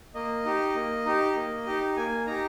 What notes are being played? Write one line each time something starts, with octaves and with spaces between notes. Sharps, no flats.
A#3 D#5
D#4 G4
A#3
D#4 G4
A#3
D#4 G4
A#3 G#5
D#4 G4 A#5